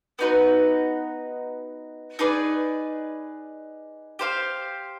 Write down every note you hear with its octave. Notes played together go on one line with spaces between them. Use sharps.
B3 D#4 F#4 B4
D#4 G#4 B4 D5
G4 C5 F5